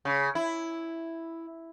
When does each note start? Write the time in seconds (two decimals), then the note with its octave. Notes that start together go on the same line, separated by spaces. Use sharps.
0.05 C#3
0.35 E4